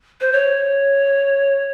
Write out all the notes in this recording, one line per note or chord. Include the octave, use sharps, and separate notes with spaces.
C5
C#5